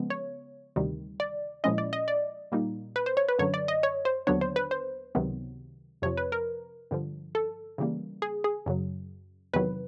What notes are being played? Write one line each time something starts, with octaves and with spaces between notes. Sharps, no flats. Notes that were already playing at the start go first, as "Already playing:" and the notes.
Already playing: C#3 F3 G#3 B3
C#5
D2 C3 D#3 G3
D5
A#2 F3 G#3 C#4 E4 D#5
D5
D#5
D5
A#2 G3 A#3 D#4
B4
C5
C#5
B4
F#2 D3 F#3 C#5
D5
D#5
C#5
C5
D#2 D3 F#3 B3 D4 C#5
C5
B4
C5
C#2 C3 D#3 F#3 B3
F2 C3 F3 C#5
B4
A#4
G2 D3 F3
A4
C#3 E3 G3 A#3
G#4
G#4
F#2 C#3 F#3
E2 C3 D#3 F#3 B4